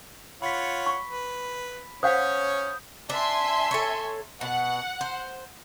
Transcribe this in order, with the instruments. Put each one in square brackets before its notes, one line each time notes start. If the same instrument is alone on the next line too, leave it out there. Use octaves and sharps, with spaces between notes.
[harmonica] F4 C#5 F#5 [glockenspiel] B5 B6
[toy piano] C#6
[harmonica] B4
[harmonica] C#4 C#5 [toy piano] C5 F5 F#5 [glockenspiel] D#6 G6
[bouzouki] D4 [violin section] E5 G#5 C6
[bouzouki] A4 C#5
[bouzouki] B2 [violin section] F#5
[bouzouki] C5